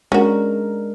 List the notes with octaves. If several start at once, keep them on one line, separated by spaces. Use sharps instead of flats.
G#3 C#4 D4 F#4 A#4